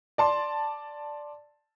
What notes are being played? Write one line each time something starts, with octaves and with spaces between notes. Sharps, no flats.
D5 A5 C6